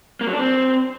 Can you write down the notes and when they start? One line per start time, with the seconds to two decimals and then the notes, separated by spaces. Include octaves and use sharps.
0.21 A#3
0.27 F#3
0.33 D4
0.39 C4